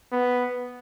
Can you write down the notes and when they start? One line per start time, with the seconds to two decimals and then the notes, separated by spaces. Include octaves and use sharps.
0.12 B3